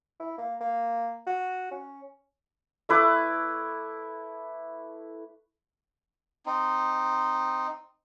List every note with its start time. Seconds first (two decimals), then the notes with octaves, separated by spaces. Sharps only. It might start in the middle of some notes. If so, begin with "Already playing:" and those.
0.19 E4
0.38 A#3
0.60 A#3
1.27 F#4
1.71 C#4
2.89 A3 E4 B4 D6
6.46 C4 D#4